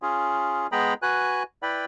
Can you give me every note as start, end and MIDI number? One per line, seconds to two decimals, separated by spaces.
0.02 0.67 61
0.02 0.67 65
0.02 0.67 68
0.72 0.94 56
0.72 0.94 59
0.72 0.94 68
0.72 0.94 79
0.72 0.94 82
0.72 0.94 83
1.02 1.43 66
1.02 1.43 71
1.02 1.43 80
1.02 1.43 90
1.63 1.85 64
1.63 1.85 71
1.63 1.85 74
1.63 1.85 79
1.63 1.85 83